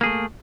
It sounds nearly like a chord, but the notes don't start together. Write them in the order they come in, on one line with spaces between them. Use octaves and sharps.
A#3 G#4 A3